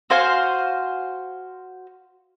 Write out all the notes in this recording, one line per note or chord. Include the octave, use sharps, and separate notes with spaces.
F#4 C5 F5 G#5